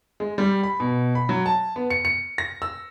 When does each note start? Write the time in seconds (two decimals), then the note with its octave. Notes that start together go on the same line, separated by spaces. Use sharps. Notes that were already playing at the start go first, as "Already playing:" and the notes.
0.20 G#3
0.38 G3
0.63 B5
0.80 B2
1.15 B5
1.29 F#3
1.46 A5
1.76 B3
1.90 C#7
2.05 C#7
2.38 A#6
2.62 E6